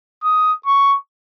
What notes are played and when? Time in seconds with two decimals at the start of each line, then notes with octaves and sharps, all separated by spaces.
0.24 D#6
0.66 C#6